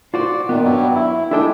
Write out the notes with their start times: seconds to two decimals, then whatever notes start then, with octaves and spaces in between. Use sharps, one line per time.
0.14 F4 F#4 C5 D5
0.49 A#2 D#3 B3
0.64 G2 F#3 G3
0.95 E4
1.31 G3 G#3 D4 E4 A4 G5